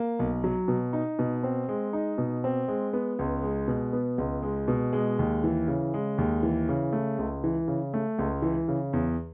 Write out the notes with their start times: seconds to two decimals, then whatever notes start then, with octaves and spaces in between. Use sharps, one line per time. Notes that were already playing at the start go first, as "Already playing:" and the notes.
Already playing: A#3
0.19 B1
0.44 F#3
0.68 B2
0.93 D#4
1.19 B2
1.43 C4
1.69 G#3
1.93 D#4
2.18 B2
2.44 C4
2.68 G#3
2.93 B3
3.19 C#2
3.43 G#3
3.68 B2
3.93 B3
4.18 C#2
4.43 G#3
4.68 B2
4.93 G#3
5.19 D#2
5.44 E3
5.68 C#3
5.94 G#3
6.18 D#2
6.43 E3
6.69 C#3
6.93 A3
7.19 C#2
7.44 E3
7.68 C#3
7.94 A3
8.19 C#2
8.42 E3
8.68 C#3
8.93 E2